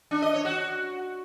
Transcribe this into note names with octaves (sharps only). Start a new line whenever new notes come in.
D4
D#5
C#5
F#4